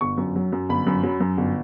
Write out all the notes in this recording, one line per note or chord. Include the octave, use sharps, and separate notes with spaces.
G1 C#6
F#2
F#3
F#2
G1 B5
F#2
F#3
F#2
G1